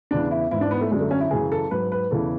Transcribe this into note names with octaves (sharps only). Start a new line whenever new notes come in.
E2 C#3 E3 D4
E4
G#2 E3 E4
D4
B3
A3
F#2 D3 F#3 G#3
A3
C#4
E4
F#2 C#3 E3 G#4
A4
G#2 F#3 B4
B4
E2 C#3 E3 A4